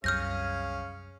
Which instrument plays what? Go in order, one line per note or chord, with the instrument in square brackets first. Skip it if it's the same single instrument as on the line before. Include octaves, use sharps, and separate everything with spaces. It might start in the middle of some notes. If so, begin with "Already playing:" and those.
[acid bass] C2 [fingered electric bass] F#2 [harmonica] C#4 G#4 F5 [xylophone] F6 G6 A#6